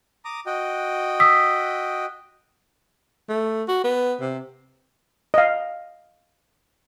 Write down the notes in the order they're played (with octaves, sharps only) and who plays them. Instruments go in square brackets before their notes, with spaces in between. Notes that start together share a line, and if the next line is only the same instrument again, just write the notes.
[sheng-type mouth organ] A#5 D6 D#6
F#4 D#5 G5
[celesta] D#6 E6 B6
[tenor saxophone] A3
F#4
B3
C3
[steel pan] D#5 F5